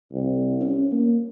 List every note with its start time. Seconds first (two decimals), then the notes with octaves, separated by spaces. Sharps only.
0.13 C2
0.61 C#4
0.92 A#3